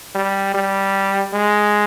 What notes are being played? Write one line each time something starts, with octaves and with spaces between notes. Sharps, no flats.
G3
G3
G#3